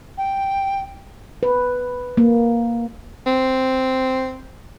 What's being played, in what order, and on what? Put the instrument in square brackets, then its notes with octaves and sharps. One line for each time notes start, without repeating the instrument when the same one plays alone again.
[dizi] G5
[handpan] B4
A#3
[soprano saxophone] C4